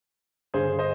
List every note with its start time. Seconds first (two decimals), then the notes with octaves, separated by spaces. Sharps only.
0.54 G2 D3 G3 G#4 C5
0.79 C5 D#5